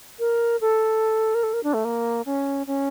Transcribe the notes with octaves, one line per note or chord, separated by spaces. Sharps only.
A#4
A4
A#4
A4
A#4
D4
A3
A#3
C#4
C#4